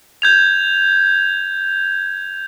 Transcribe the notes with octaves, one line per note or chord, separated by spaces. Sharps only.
G6 G#6 F7